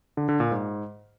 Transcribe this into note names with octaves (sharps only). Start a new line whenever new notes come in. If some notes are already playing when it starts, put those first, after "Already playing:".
D3
D3
A#2
G#2